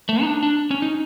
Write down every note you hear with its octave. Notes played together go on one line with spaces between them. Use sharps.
A3
D#4
D4
D4
C#4
D#4